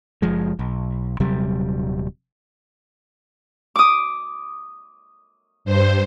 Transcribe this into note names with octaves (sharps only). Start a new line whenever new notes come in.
F#1 F3 G#3
B1
D#1 C3 F#3 G3
D6 D#6
G2 C5